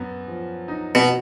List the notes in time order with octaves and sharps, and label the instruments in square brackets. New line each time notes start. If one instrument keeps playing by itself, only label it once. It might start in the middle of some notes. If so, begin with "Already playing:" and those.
Already playing: [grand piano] F#2 B3
F3
D#4
[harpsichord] B2